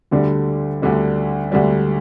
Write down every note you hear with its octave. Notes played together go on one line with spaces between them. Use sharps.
D2 D3 G3
D2 D3 G3
D2 D3 G3